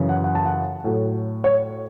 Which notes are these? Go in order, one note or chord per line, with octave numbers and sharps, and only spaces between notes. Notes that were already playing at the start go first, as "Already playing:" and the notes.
Already playing: F#2 C#3 E3
F#5
F#5
A5
F#5
A2 F#3
C#5